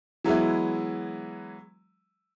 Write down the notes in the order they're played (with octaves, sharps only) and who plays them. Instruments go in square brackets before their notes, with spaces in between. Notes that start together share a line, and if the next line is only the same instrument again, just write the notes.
[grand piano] E3 F#3 G#3 B3 E4